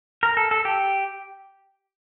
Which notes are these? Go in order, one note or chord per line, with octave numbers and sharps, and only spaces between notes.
A#4
A4
A4
G4